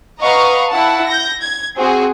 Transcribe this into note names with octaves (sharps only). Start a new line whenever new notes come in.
B4 D#5 F5 F#5 A#5 C#6
E4 F#5 A5
G6 A#6
G#6
C4 F#4 G#4